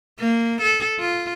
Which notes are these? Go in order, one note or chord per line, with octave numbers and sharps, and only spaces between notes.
A#3
A4
F4